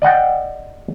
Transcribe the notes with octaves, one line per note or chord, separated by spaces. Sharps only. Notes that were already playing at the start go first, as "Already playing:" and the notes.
D5 D#5 F#5 G5